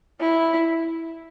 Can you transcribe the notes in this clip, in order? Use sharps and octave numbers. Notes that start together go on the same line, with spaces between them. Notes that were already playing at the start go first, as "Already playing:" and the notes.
E4